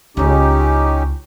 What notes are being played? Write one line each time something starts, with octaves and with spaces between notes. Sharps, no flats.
C#2 C#4 D#4 E4 G4